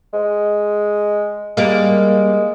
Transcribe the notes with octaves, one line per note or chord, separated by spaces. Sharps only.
G#3
G3 G#3 A#3